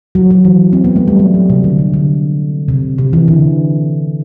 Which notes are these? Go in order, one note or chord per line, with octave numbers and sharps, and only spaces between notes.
F#3
F#3
E3
C4
B3
A3
G3
F#3
F#3
C3
D3
C3
D3
C3
C3
E3
D3